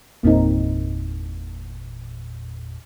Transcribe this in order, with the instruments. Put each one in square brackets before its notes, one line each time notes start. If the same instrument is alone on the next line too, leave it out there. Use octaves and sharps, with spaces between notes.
[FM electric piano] G1 E2 A#2 [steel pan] A#3 C4 D#4